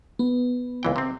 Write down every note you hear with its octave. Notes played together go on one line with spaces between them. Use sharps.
B3
C#2 E3 G5
C3 C4